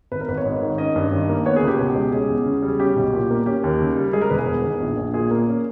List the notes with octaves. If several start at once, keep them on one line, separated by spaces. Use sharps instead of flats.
G#1 B4
A#4
G#1 B4
C#5
G#2
D#3
C#4 D#5
G2
D#3
A#3
B3 C#5
G#4
C#2
G4
B2
G#3
C#4 G#4
E2
C#3
G3
G#4
C#4 G4
B1
A#2
A#3
C#4 G4
D#2
C#3
G3
G#3 G#4
A#4
E1 B4
G#4
E2
D#3
A#1
A#1
A#2 G#4
A#3
C#4